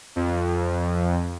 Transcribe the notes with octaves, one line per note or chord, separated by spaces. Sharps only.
F2